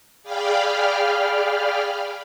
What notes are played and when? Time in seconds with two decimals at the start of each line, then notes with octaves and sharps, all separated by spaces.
0.23 G#4 D5 F5 G5 B5 F6